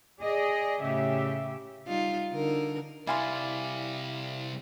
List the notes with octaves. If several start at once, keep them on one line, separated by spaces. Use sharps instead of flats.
G#4 D5 D#5
A2 C#3 G4 E5
G3 D#4 F4
D3 D#4 A#4
C3 G3 E4 D5 F5 G#5 C6